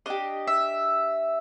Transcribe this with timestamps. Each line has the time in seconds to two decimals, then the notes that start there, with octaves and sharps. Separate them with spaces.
0.06 D4 G4 D#5
0.47 E5